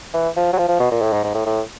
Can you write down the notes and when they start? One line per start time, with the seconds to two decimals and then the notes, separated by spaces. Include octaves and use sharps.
0.14 E3
0.37 F3
0.53 F#3
0.58 F3
0.68 F3
0.80 B2
0.91 A#2
1.02 A2
1.13 G#2
1.24 G#2
1.34 A2
1.46 A2